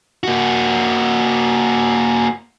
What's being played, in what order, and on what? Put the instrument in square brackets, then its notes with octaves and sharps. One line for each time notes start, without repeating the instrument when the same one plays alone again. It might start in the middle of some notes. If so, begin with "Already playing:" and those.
[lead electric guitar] A#3 F#4